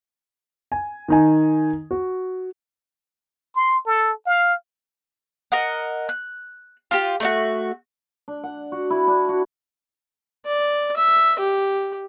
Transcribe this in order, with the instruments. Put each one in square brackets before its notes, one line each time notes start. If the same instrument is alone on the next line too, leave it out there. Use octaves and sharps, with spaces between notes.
[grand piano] G#5
D#3 D#4 G#5
F#4
[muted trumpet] C6
A4
F5
[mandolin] A#4 D#5 F#5
F#6
F4 G4
A3 D4 F#4
[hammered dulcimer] D4
F#5
F#4
E4
D4
F#4
[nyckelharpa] D5
E5
G4